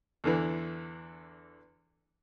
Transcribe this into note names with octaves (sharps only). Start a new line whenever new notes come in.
E2 D3 E3